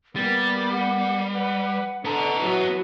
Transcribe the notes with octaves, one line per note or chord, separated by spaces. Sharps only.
G3 A#3 B3 A6
F#5
B4 F#5
D3 B3 D4 A5 A#5
E3 F#3 F#4